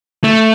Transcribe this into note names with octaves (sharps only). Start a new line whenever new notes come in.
A3